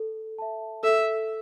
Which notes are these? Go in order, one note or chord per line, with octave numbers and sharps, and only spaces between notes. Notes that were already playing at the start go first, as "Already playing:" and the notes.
Already playing: A4
E5 A5
A4 E5